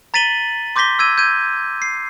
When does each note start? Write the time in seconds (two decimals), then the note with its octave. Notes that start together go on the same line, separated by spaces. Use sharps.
0.14 A#5 A6 B6 D#7 F#7 G7
0.76 C6 D6 G6 A#6 B6 G7
0.99 E6 G#6 D#7
1.18 G6 G#6 D#7
1.82 C7